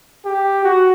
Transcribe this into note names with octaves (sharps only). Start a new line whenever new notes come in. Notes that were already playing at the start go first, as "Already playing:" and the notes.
G4
F#4